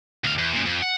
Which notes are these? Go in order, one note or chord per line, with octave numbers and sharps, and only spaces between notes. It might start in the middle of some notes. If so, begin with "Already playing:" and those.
D2 F5
E2
F#2 A#2
F2
F#5